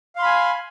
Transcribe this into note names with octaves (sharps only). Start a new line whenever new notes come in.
F5 G#5 B5 C6